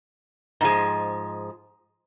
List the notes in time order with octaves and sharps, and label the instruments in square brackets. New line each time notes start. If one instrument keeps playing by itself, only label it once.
[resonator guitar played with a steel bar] G#2 F3 G#3